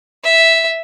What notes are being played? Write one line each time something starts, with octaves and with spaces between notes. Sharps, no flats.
E5